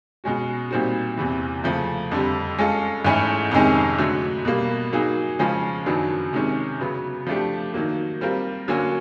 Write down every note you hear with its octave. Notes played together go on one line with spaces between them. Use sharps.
B2 G#3 C#4 F#4
A#2 G3 C4 D#4 F#4
E2 C3 E3
C#3 F3 A3
F2 D3 G3
G#3 C#4 F4 A4
G#2 E3 A3 C#4 E4
F2 C3 D#3 G#3 C#4
D3 F#3 A3
B2 G3 A#3
F#3 A#3 D#4 G#4
C#3 F3 G#3 C#4 F4
F#2 D#3 F#3 B3 D4
C3 D#3 G#3 C#4
C#3 F#3 B3
F3 A3 D4 G4
D#3 F#3 A#3
G3 C4 F4 A#4
D3 F#3 A#3 C#4